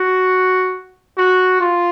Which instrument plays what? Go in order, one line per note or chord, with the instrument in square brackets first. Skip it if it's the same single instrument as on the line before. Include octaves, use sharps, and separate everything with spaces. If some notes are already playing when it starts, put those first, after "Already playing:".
Already playing: [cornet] F#4
F#4
F4